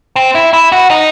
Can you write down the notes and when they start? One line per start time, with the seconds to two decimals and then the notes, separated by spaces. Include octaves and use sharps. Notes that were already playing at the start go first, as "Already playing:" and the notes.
0.16 C4
0.35 E4
0.53 E4
0.72 F#4
0.90 D#4